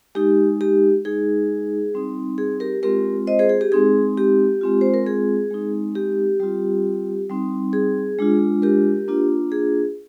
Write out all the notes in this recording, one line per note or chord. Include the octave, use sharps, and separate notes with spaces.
G#3 D#4 G4
G4
G#3 D#4 G#4
G3 C4 D#4
G#4
G4 A#4
G#3 C4 F4 G4 A#4
C5 D#5
G#4 C5
G#4
G4
G#3 C4 D#4 G#4
G4
G#3 C4 F4
C5
A#4
G#4
G#3 C4 D#4
G4
G3 C4 F4
G3 C4 D#4
G#4
G#3 D4 F4
G4 A#4
A#3 D4 F4
G#4